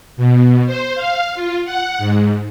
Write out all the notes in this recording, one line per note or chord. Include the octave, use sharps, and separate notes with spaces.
B2
C5
F5
F4
F#5
G#2